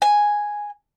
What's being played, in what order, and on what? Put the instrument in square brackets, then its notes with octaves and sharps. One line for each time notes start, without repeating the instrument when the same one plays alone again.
[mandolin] G#5